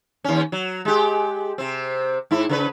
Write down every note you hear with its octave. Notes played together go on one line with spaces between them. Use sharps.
D#2 C#4
F#3
G#3 G4
C3 C4
G#2 E4
C#3 A#4 B4